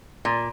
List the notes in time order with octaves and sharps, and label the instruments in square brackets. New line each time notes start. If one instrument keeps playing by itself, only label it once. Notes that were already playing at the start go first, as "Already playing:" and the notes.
[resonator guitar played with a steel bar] A#2